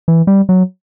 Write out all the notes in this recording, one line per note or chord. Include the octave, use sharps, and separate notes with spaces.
E3
G3
F#3